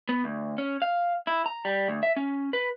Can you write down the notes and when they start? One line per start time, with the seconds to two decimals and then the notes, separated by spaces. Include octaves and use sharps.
0.09 B3
0.24 D2
0.58 C#4
0.82 F5
1.27 E4
1.46 A#5
1.65 G3
1.88 D2
2.03 E5
2.16 C#4
2.53 B4